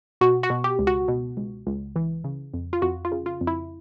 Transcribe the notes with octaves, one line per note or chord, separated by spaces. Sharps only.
B2 F#4
F#4
B2
G4
C#2
F#4
B2
C#2
C#2
E3
C#3
F2
F4
F2 F#4
F4
C#3
F4
F2
E4